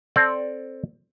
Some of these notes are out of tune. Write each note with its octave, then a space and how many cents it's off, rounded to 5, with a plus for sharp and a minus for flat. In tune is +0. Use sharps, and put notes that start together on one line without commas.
C4 +10 A4 -5 D5 +0